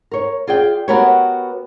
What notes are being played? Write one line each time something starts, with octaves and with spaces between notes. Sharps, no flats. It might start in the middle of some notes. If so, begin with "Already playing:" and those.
A#4 C#5
F4 G#4 D5 G5
B3 F#4 G4 A#4 B4 C#5